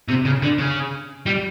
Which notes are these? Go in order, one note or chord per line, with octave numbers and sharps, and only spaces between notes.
C3
C#3
D3
C#3
G3